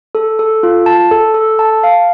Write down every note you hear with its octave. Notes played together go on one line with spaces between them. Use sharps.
A4
A4
F4
A5
A4
A4
A5
F5